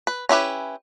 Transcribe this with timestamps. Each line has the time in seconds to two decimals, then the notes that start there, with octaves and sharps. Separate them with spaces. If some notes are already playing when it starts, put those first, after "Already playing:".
0.07 B4
0.29 C#4 E4 G4 B4